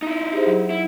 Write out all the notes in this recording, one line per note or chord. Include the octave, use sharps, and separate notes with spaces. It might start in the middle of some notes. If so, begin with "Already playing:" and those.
D#4 E4
G4 G#4 C5
F#3
E4